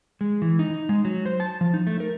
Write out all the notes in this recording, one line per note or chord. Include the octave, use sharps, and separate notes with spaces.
G#3
E3
D#4
G#3
F#3
C5
A5
F3
D#4
A3
A#4